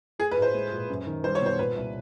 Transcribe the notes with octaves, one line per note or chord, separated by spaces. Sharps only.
A3 G#4
B4
A2
C5
G#3
A#2
F#2
D#3
G3 C5
C#5
B2
C5
A#2 B4
C2